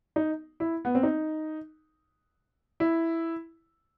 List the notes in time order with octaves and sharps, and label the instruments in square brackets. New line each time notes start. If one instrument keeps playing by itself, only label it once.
[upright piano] D#4
E4
B3
C4
D#4
E4